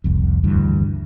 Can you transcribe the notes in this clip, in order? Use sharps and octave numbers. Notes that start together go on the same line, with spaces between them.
F1 C2 F2
D2 G2 E3